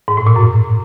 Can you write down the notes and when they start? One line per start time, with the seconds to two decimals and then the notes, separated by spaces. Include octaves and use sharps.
0.08 G#2
0.17 A2
0.27 A#2
0.36 F#2